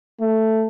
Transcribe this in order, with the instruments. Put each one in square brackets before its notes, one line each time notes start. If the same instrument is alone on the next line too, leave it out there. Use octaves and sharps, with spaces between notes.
[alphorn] A3